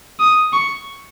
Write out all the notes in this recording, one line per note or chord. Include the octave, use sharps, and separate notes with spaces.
D#6
C#6